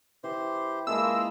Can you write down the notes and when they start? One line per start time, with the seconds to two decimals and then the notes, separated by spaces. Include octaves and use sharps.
0.24 E3 G4 C5 C6
0.87 G#3 A#3 E4 F4 G#4 A5 E6